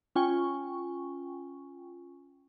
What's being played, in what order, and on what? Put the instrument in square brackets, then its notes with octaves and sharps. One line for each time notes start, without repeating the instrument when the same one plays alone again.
[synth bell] C#4 F4 G5 G#5 C#6